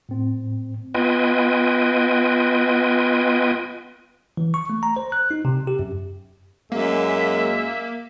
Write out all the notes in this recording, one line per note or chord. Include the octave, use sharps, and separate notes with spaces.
A2 C4
B3 F4 B4 D#5 G5 G#5
E3
C#6
A3
A#5
C5
F#6
D#4
C3
G4
F#2
F#2 G#3 A#3 E5